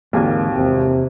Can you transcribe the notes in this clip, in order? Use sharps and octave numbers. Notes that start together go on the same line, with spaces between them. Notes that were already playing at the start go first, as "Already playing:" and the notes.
G#1 D#2 D3 E3 G#3 A#3 G#5
E2 C3